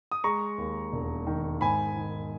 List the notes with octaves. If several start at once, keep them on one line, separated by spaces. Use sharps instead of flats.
D#6
G#3 A#5 C#6
D#2
E1
D#3
G#2 G#5 B5
D#3